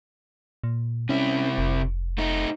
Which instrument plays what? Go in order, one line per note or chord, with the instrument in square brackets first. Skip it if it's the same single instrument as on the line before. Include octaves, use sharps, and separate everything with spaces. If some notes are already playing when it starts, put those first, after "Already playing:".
[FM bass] A#2
[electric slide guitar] C3 E4 [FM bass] C#4
[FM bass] F1
[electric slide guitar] A3 D#4